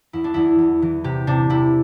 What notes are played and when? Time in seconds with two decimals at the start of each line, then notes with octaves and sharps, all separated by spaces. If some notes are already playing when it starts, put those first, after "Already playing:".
0.13 E2 E4
0.24 D4
0.34 E2 E4
0.59 E2
0.82 E3
1.04 C3 G4
1.27 C3 D4
1.50 C3 E4